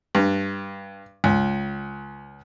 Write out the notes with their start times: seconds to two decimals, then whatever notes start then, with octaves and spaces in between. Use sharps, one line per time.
0.15 G2
1.24 C#2